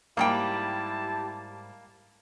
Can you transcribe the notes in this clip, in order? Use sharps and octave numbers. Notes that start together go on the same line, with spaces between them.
G#2 G3 A#3 E4 G4 G5 A5